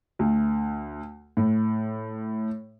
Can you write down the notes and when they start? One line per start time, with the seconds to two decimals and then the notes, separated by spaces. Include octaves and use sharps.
0.19 D2
1.37 A2